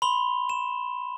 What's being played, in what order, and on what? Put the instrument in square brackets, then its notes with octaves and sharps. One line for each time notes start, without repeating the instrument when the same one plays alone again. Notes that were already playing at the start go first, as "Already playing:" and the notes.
[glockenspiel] B5 C6 F7 G7
E7